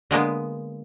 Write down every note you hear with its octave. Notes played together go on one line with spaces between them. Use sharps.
D3 G#3 A#3 B3